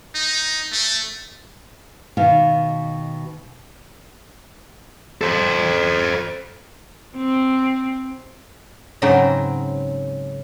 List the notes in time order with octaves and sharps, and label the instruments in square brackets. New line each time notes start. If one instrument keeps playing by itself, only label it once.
[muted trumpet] D#4
A3
[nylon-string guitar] B2 D#3 F5
[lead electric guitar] A4 C5
[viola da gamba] C4
[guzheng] G#2 C#3 F#3 C4 D#4 E4